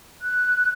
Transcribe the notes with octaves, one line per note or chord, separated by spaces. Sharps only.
F#6